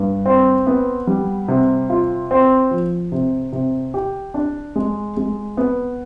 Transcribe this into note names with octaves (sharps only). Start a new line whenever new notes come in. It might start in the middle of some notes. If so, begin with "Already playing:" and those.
Already playing: G2
C4
B3
G3
C3
F4
C4
F3
C3
C3
G4
D4
G#3
G#3
B3